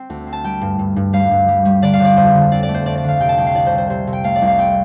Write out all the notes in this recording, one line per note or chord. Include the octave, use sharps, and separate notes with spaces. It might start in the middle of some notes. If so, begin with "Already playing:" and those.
Already playing: C4 G5
D2
C4
A5
G3 G5
G2
G2
G2
G3 F5
G2
G3
G3
D3 D5
F5
D3 D5
F2 C5
D3
C4 D5
D5
A3
C5
F2 D5
D5
D3 F5
C3 G5
A5
C2 G5
F5
C2 D5
C5
C3
C5
C3 C5
C3
G5
A3 F5
D5
C2
F5
C4 G5